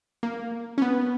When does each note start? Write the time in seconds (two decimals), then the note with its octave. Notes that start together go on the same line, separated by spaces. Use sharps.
0.23 A#3
0.78 C#4
0.82 B3